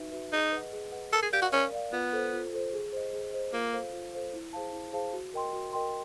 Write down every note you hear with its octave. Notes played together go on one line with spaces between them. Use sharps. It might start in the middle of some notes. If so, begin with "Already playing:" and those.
Already playing: D#4 F#4 B4 E5
F#4 B4 E5
D#4 G#4
B4 D#5 F#5
G#4
B4 D#5 F#5
A4 A#4
G#4
G4 D5 F5
F#4
C#4 A#4
D5 F5
B3 F4
A4 C5
F4
A4 C5
G#4
C5 D#5
G#4
C5 D#5
A#3 F4
A4 C5 F5
F4
A4 C5 F5
E4
G#4 C5 F5 A5
E4
G#4 C5 F5 A5
F#4
A#4 D#5 G5 C6
F#4
A#4 D#5 G5 C6